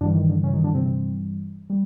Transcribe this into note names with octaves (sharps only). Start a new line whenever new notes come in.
G2 D3 E3 G3 D4
D#3 D#4
D3 D4
C#3 C#4
D#3 D#4
D3 D4
C3 C4
C3 C4
G3